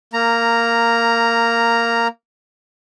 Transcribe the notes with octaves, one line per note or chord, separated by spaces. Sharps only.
A#3 A#5